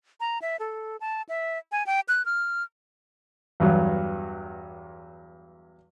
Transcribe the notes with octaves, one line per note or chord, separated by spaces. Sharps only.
A#5
E5
A4
A5
E5
G#5
G5
F#6
F6
E2 G2 F#3